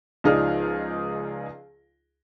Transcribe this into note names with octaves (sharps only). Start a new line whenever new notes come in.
C#2 F3 D#4 G#4 D5 F6